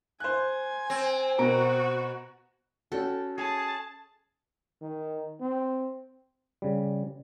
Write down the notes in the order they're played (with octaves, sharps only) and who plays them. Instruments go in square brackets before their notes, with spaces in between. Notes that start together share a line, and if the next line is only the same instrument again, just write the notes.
[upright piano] C5 F#6 [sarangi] G#5
[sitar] C4
[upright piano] B2 A#4 D7 [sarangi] F#4
[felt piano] C#4 F#4 [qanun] A4 G5
[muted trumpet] G#4 [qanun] C#5 [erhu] A5
[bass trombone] D#3
C4
[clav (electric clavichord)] C#3 G3